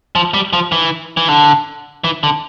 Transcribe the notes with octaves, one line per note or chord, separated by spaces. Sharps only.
F3
G3
F3
E3
E3
D3
E3
D3